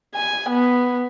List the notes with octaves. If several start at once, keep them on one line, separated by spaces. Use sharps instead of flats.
G#5
B3